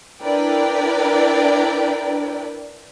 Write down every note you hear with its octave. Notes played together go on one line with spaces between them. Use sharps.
D4 E4 A#4 B4 D5 G5